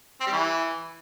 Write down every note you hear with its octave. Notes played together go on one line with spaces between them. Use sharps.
C4
G3
E3